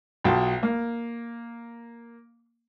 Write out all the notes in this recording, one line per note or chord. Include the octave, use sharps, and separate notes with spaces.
B1 F#3 F4 G5 A5
A#3